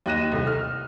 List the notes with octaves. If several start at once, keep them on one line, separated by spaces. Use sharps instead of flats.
D#2 D#4 F#6 A#6 D#7 E7
C2 A3
F6